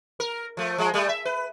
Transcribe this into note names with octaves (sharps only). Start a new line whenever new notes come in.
A#4
F3 A3
F3 G#3
G3 A3
E5
B4